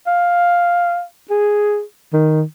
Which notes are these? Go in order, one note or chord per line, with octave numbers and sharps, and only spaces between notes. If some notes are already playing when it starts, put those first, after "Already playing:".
F5
G#4
D#3